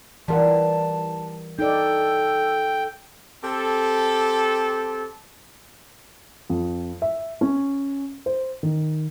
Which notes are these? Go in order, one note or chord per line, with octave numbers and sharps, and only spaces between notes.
E3 G3 F4 A#4 F#5 A5
D#4 A4 D5 G5
C4 G4 A4
F2
E5
C#4
C5
D#3